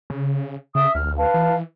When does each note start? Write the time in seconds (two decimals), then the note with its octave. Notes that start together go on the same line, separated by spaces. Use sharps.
0.10 C#3
0.75 C#3 E5 D#6
0.95 D2 F6
1.17 B4 F5 A5
1.34 E3